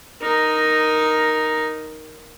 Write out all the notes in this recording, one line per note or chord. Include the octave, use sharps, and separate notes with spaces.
D#4 A#4